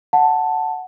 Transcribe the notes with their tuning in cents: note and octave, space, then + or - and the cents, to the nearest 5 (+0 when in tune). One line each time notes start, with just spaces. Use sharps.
F#5 +0 A5 +0